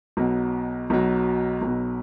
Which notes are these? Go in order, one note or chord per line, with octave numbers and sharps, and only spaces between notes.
B1 B2 F#3
B1 B2 F#3
B1 B2 F#3